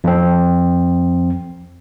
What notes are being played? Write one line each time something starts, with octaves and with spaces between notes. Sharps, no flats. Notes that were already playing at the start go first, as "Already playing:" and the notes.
F2 C4